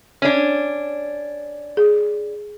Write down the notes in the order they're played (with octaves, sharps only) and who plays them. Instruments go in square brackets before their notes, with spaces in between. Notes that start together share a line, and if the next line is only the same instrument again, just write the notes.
[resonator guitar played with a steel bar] C#4 D4
[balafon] G#4